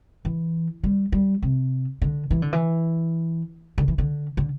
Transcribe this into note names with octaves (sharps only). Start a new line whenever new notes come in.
E3
G3
G3
C3
D3
E3
D3
E3
D3
E3
D3
D3